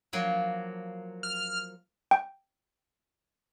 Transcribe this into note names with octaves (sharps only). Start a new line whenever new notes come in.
F3 F#3 A#3
F6
G5